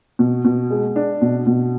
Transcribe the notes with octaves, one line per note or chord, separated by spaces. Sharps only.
B2
B2
G#3
D4
B2
B2